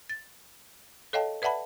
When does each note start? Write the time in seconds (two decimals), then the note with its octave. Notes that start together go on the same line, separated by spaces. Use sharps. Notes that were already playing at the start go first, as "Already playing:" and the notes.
0.09 A6
1.13 A4 C#5 D#5 F5 G5 A5
1.42 B4 D5 E5 F#5 A5 B5